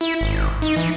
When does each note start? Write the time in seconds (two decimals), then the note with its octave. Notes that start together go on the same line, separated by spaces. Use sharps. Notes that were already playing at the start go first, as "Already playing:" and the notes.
0.01 E4
0.21 G#1
0.62 D#4
0.76 E3